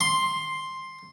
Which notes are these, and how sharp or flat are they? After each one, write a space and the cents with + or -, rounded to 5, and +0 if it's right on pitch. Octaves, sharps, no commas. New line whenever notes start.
C6 +5